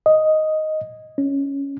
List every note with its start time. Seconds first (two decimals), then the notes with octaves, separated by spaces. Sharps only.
0.06 D#5
1.18 C#4